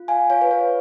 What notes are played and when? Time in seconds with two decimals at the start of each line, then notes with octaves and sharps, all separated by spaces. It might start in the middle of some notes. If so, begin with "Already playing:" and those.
Already playing: F4
0.08 F5 G#5
0.30 F4 C#5 F5
0.42 B4
0.51 C#5